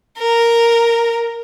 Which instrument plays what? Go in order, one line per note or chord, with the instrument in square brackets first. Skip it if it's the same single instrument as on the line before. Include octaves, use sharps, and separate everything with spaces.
[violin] A#4